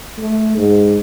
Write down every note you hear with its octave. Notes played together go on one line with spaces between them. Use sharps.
A3
G#2